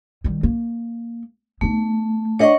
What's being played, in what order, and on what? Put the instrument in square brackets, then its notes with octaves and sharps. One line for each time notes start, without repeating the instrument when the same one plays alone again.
[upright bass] D#3 G3
A#3
[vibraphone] A3 [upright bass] B3 D#4
[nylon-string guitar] D4 D#5 [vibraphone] C#5 F#5 C#6